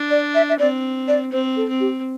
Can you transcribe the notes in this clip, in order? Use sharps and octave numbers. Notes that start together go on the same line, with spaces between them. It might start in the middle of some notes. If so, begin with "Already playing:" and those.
Already playing: D4
D5
E5
E5
C4 D5
D5
C4 C5
A4
C4
G4